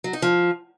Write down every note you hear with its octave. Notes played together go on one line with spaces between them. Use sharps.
F#3
D#4
F3